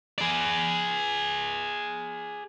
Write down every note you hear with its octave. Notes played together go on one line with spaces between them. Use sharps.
G#4 D5